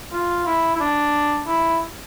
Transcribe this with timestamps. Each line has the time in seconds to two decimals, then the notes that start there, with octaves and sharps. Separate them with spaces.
0.12 F4
0.46 E4
0.75 E4
0.80 D4
1.47 E4